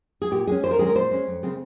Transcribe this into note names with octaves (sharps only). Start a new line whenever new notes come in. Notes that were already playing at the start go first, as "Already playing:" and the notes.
G#4
A#2 G4
G#3 C#4 G#4
F2 C5
A#4
D#3 G#3 C#4 G#4
A#4
A#2 C5
G#3 C#4
F2
C#3 G#3 C4